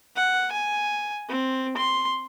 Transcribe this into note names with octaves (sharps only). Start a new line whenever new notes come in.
F#5
G#5
C4
C6